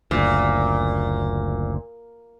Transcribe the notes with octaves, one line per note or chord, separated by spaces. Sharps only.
F#1 D2 A#2